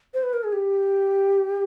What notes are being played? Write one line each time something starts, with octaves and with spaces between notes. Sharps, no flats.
C5
B4
A#4
G#4
G4